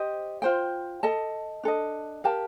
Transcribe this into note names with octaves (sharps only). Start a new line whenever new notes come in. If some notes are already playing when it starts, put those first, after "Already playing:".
Already playing: G4 C5 D#5
F4 C5 G5
A4 D#5 A5
D4 A4 D#5
G4 A#4 F5 A5